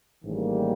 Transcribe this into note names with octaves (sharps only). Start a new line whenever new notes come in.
A1 G#2 D#3 G3 A#3